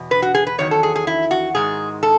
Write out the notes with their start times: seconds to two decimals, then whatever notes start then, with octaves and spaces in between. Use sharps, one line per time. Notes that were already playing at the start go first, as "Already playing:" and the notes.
Already playing: E2 B2
0.11 B4
0.22 F#4
0.35 G#4
0.47 B4
0.58 E2 D#3 F#3 C#5
0.71 A4
0.83 G#4
0.96 G#4
1.07 E4
1.31 F#4
1.55 G#2 D#3 G#3 G#4
2.03 A4